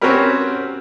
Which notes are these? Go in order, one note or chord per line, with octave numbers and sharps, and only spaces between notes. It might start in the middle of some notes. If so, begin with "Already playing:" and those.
C4 C#4 F#4 G4 A#4 B4